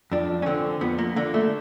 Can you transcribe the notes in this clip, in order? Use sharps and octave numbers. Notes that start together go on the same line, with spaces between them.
F2 D4
C#4
D3 C4
F2 B3
A#3
D3 A#3
A3